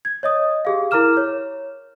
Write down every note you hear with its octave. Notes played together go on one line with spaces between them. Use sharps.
G#6
C#5 D#5 D#6
G4 G#4 F5
E4 A#4 A#5 D6 F6 E7
C#5